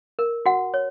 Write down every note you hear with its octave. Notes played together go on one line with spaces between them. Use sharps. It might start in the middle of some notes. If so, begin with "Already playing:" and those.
A#4
F#4 F#5
C#5